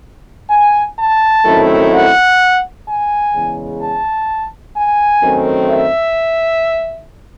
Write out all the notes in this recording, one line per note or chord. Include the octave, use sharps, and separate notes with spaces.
G#5
A5
F#2 D#3 A3 C4 E4
F#5
G#5
E2 C#3 G#3
A5
G#5
F#2 D#3 A3 C4
E5